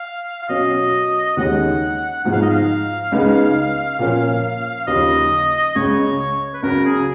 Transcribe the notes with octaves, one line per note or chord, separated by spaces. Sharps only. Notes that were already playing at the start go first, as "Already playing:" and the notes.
Already playing: F5
F5
B2 F#3 C#4 D#5
D#2 D#3 G#3 C#4 F#5
G#2 F3 G#3 D#4 F#5
F5
D#5
F5
C#2 C#3 G#3 B3 D#4
A#2 F3 A#3 C#4
D#2 C#3 F3 D#5
C#2 C#3 G#3 C#5
B4
C#2 C#3 F#3 A#4
G#4